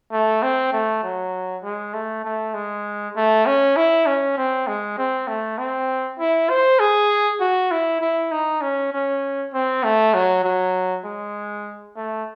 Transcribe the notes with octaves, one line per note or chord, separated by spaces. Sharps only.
A3
C4
A3
F#3
G#3
A3
A3
G#3
A3
C#4
E4
C#4
C4
G#3
C4
A3
C4
E4
C5
G#4
F#4
E4
E4
D#4
C#4
C#4
C4
A3
F#3
F#3
G#3
A3